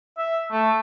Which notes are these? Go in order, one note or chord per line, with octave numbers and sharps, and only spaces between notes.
E5
A3